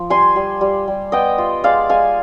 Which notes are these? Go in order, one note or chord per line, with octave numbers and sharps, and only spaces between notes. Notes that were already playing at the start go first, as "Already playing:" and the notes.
Already playing: F3
G3 G#5 C6
G3
G3
G3
B3 D#5 G5
F4
G#3 D5 F5
G#3 F5 G#5